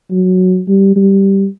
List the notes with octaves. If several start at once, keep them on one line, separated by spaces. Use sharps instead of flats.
F#3
G3
G3